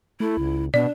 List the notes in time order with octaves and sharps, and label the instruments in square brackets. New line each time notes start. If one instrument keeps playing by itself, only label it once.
[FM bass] A3 [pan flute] E4
[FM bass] C#2
[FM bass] B2 [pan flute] D4 [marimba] D5